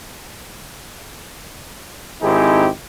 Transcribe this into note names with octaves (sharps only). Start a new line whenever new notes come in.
G#1 C4 D#4 E4 G4 G#4